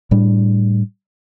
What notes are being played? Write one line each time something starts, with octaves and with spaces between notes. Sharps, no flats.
A2 G3 D4